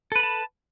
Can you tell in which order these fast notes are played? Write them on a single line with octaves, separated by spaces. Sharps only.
A4 B4 B5 A5